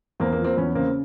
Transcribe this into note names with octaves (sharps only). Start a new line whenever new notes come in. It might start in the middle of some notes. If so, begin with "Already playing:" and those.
E2 A#3 C4
A#3 C4
F3
A#3 C4
E2 B3 C#4
C#3 A#3 C4